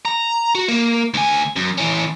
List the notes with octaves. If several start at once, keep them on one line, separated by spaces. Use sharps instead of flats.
A#5
F#4
A#3
D2 G#5
F#2
E3 C#4